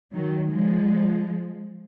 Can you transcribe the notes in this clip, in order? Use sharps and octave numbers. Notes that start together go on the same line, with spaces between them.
D#3 F#3
F3 G#3